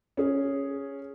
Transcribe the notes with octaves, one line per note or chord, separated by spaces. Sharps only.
C#4 G#4